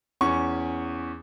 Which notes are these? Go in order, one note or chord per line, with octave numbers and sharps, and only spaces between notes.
E2 C#4 C#6